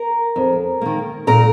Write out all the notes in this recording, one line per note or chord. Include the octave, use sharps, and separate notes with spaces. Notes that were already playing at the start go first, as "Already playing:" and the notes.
Already playing: A#4 A#5
F2
D#3 A#3
A#2 A#4 A#5